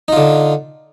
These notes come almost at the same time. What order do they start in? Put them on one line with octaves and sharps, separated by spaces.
D#4 F4 D3